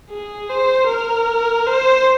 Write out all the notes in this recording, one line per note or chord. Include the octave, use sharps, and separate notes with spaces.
G#4
C5
A#4
C5